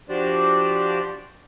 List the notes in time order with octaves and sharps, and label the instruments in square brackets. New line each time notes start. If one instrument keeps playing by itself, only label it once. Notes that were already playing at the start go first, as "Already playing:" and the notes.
[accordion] F3 D4 F#4 G4 C5 D5